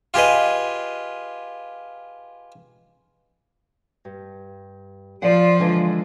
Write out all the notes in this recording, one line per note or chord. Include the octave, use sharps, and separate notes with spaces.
F4 G4 G#4 B4 D#5
G2
F3 F4 C5 D5 F#5
D3 E3 G#3